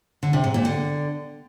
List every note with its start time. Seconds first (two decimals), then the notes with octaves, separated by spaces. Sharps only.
0.23 D3
0.33 C3
0.44 G#2
0.54 A#2
0.65 D3